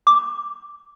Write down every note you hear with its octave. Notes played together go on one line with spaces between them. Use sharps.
D6